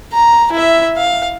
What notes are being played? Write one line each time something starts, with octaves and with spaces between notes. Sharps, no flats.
A#5
E4 E5
F5